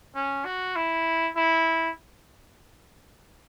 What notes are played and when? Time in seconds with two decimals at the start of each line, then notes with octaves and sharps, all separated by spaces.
0.16 C#4
0.45 F#4
0.76 E4
1.36 E4